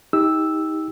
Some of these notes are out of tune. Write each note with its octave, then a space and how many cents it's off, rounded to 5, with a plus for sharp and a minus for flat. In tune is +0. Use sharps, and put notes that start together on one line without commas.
D#4 +30 G4 +20 E6 +0